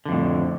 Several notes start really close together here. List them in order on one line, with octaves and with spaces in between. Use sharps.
D3 F2 A2